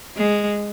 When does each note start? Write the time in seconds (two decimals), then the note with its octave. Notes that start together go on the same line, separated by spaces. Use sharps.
0.17 G#3